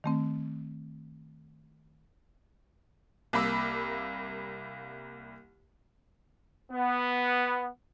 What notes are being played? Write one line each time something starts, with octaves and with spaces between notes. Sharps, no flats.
D#3 A3 C4
C2 A#3 B5 D6 E6
B3